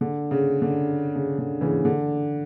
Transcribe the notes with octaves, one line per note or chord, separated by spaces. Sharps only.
D3
C#3
D3
C#3
D3
C#3 E3
D3